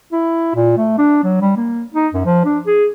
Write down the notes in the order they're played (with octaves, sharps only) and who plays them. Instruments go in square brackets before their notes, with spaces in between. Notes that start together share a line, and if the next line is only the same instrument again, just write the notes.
[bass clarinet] E4
A#2
A3
D4
F#3
G3
A#3
D#4
F#2
F3
D4
G#4